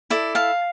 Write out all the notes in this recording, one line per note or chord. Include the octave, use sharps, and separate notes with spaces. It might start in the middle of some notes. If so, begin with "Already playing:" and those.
E4 A4 D5
F5 A5